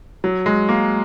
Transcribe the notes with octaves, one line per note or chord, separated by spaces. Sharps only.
F#3
G#3
A#3